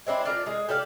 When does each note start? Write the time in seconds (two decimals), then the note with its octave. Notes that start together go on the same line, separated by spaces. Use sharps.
0.07 G#3 C4 D4 E4
0.25 D4 F4 A#4 A#5
0.46 G#3 G#4
0.69 G4 A4 D5 F5